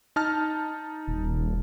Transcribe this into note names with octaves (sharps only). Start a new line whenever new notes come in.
D#4 A5 F6
D#1